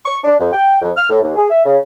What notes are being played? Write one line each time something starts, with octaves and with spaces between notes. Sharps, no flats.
C#6
D4
F2
G5
F2
F6
A2
D#2
G#4
E5
C#3